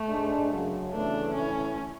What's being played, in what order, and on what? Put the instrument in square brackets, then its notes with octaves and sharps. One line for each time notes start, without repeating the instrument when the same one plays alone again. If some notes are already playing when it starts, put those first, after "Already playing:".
Already playing: [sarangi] A3
[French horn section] G#2 G#3 D4
F#2 C#3 F#3
[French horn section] E2 C#3 E3 A3 [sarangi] D4
[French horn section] A2 E3 A3 E4 [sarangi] C#4